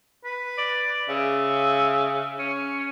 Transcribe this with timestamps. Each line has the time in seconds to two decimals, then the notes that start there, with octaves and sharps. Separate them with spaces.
0.24 B4
0.58 D5
1.09 C#3 E5
2.39 C#4